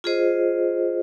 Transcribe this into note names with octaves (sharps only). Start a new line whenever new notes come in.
F4 G#4 C5 D#5